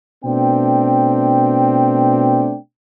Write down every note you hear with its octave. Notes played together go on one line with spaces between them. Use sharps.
B2 A3 C4 D4 G5